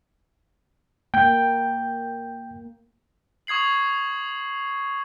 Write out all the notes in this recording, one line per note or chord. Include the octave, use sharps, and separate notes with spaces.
A#3 G5 G6
C#6 D#6 G#6 C7 F#7